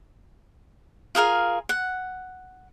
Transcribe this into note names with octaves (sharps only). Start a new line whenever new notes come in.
F4 G#4 A#4 F5
F#5